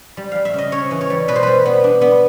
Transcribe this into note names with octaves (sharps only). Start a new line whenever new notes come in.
G3
G3 F5
E5
C#3 D#5
C#3 C#5
E3
C#5
G3
B2 B4
C5
G3 B4
B3
D4
B3